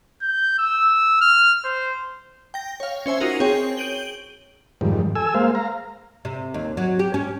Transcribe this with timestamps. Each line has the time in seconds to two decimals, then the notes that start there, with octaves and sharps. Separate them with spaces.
0.22 G6
0.58 E6
1.21 F6
1.65 C5
2.54 G5 A#6
2.80 C#5 F5
3.06 C#4 C5 E5 G#5
3.20 D#4 F4 F#4 A#4
3.40 C4 G#4 C#5 G5
3.77 G6 D7 D#7 F#7 G7
4.81 F2 G#2 D#3 G3
5.15 A4 G#5 E6
5.34 G#3 A#3 C5 F5
5.55 F5 A#5
6.25 C3
6.54 D#2
6.77 F#3
6.99 G4
7.14 C#4